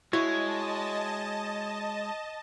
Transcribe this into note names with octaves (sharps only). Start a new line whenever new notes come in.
G#3 E4 F#4 C#5 D#5 A5